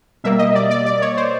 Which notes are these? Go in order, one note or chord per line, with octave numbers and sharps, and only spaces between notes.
B2 G3 A#3 E5
D#5
D5
D5
D5
C#5
C5